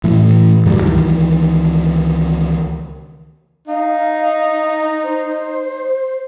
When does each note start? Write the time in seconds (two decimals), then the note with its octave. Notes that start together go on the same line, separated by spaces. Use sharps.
0.04 A2 E3 A3
0.66 D2 G2 F#3 G3
0.83 C#2 C3 D#3 E3
3.68 D#4 F5
5.04 C5